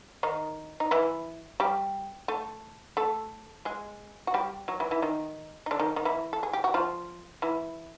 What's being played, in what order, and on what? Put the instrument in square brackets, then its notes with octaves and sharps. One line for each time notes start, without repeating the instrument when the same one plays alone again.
[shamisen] D#3 D#4
D#4
E3 E4
G3 G4
A3 A4
A3 A4
G#3 G#4
F#4
G3 G4
F#3 F#4
E3 E4
E3 E4
D#3 D#4
D#4
D3 D4
D#3 D#4
D#3 D#4
E3 E4
A4
G#4
G4
F#4
F3 F4
E3 E4